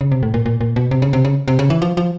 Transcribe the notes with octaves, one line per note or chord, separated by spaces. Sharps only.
C#3
C3
A2
A#2
A#2
A#2
B2
C3
C#3
C3
C#3
C3
C#3
E3
F3
F3